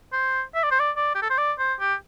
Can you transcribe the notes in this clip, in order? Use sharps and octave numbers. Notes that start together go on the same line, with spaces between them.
C5
E5
D5
C5
D5
D5
G4
A4
C5
D5
C5
G4